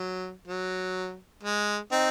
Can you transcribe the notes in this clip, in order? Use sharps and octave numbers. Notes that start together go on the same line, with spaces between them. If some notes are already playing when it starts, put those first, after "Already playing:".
Already playing: F#3
F#3
G#3
C4 D#4